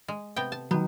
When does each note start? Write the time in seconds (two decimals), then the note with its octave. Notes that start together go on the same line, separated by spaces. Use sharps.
0.08 G#3
0.36 C3 B3 G5
0.52 A5
0.71 D#3 F#3 B3